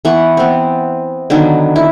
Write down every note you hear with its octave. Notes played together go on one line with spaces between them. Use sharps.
E3 B3 F#5 C#6
B3 C4
D3 D#3 F#3 B3
E4